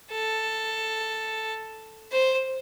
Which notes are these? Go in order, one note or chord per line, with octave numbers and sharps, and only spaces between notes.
A4
C5